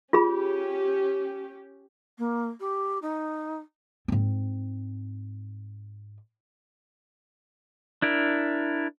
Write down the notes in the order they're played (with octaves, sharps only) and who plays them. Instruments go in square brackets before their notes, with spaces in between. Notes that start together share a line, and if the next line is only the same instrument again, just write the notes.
[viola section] C#4 G4 [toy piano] F4 G#4 B5
[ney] A#3
G4
D#4
[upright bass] G#2 C4
[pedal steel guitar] D4 E4 A#4